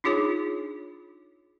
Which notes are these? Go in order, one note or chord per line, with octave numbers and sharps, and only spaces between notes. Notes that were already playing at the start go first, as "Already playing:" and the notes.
D4 D#4 F4 G#4 C#5